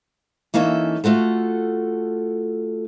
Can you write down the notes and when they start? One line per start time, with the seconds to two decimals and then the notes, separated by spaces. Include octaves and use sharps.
0.54 E3 A#3 C#4 D#4 A4 E5
1.04 A3 F4 F#4 A4